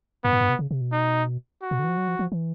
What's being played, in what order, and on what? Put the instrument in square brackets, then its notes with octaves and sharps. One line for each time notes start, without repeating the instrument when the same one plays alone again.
[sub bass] G2 [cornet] B3
[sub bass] G#2
G2
C3
C#3
C3
B2
[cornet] D#4
F#4
[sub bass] B2
D3
E3
F3
F#3
F3
F3
E3